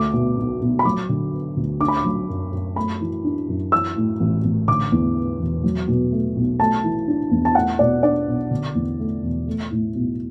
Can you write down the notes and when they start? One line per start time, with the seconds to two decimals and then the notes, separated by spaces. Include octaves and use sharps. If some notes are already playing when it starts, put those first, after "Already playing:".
Already playing: D2 A3 D6
0.13 B2
0.37 B1
0.61 B1
0.79 B5
0.85 F#3 D6
1.09 D3
1.33 B3
1.57 D2
1.81 D4 D6
1.88 B5
1.97 D6
2.05 F#3
2.29 F#2
2.53 F#2
2.76 A3 B5
3.01 E3
3.24 D4
3.49 F#2
3.72 E3 E6
3.96 A2
4.20 A1
4.44 A1
4.68 D3 D6
4.92 E2
5.16 B3
5.40 E1
5.64 F#3
5.88 B2
6.12 A3
6.36 B1
6.59 A3 A5
6.84 E3
7.08 D4
7.31 E2
7.45 A5
7.55 A3 F#5
7.79 B2 D5
8.03 D4 D5
8.27 B1
8.51 D3
8.75 E2
8.99 A3
9.23 E1
9.47 A3
9.71 A2
9.95 B1